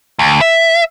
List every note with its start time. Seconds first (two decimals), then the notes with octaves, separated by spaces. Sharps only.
0.19 D2
0.41 E5